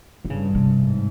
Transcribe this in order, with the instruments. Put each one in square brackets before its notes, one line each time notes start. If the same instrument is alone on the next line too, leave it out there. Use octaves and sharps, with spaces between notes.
[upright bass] D3
[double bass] G2 [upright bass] C#3
[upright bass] C3
[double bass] G#2